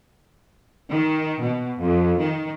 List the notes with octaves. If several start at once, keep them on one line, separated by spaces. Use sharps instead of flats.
D#3
B2
F2
D#3